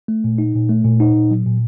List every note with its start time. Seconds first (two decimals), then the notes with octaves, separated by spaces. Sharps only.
0.08 A3
0.24 A#2
0.38 D#4
0.55 A#2
0.69 A3
0.84 A#2
1.00 D#4
1.15 A#2
1.31 F#3
1.46 A#2